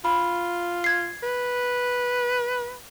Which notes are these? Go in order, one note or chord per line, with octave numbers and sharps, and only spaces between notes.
F4 B5
G#6 C7
B4